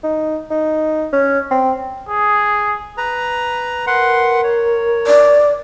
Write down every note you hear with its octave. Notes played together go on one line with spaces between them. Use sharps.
D#4
D#4
C#4
C4
G#4
B4 A#5
A#4 B4 F#5 C6
C#5
D5